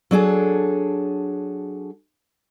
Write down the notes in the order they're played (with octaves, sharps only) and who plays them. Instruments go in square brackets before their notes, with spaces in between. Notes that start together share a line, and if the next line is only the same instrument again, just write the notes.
[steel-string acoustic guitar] F#3 D4 G#4 A4